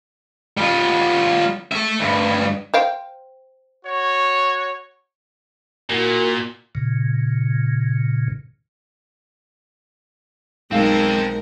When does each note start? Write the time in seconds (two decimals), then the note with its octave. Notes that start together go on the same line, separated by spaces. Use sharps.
0.57 G3 F4
1.72 A4 E5
1.99 D2 G2
2.74 C5 F5 G5
3.85 F#4 C#5
5.90 A#2 E4 F#4 A#4
6.75 A#2 C#3
10.71 B1 G#3 C4 A4 A#4 F5